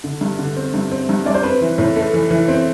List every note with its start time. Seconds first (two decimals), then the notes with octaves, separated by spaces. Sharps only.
0.04 D3
0.21 G2
0.39 D3
0.56 C4
0.74 G2
0.92 C4
1.09 G2
1.26 G2 D5
1.34 C5
1.43 C4 B4
1.61 E3
1.78 A2
1.96 A3
2.14 E3
2.31 E3
2.48 C4